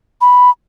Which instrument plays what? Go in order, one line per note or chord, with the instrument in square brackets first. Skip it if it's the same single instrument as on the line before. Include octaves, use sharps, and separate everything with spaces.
[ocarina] B5